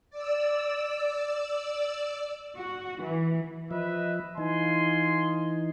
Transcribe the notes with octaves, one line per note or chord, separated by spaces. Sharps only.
D5 E6
F#4
E3
F3 B4 D#5 E5
E3 D#4 F4 G#5 C6